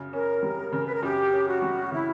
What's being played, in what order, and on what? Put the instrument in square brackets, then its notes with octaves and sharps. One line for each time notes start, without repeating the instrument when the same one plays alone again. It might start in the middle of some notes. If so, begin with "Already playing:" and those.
Already playing: [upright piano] F#2 C#3
[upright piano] C#4 [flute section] A#4
[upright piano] G3
C#3
[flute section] B4
A#4
[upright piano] F#2 [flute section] G4
[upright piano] C#4
[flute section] F#4
[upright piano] G3
[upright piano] C#3 [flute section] E4